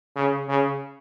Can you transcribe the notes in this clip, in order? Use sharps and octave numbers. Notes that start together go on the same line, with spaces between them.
C#3
C#3